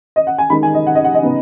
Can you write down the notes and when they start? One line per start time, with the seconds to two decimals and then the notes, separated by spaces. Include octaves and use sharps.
0.16 D#5
0.27 F#5
0.38 G#5
0.50 D#3 G#3 D#4 B5
0.63 G#5
0.74 D#5
0.87 F#5
0.95 D#5
1.04 F#5
1.14 D#5
1.23 C#3 B3 D#4